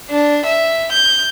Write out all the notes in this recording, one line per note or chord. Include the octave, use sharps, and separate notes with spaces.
D4
E5
G6